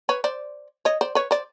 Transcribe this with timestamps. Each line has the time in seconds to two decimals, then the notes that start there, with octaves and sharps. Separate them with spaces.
0.09 B4 C#5
0.24 C5 D5
0.85 C#5 D#5
1.01 C5 D5
1.15 B4 C#5
1.31 C5 D5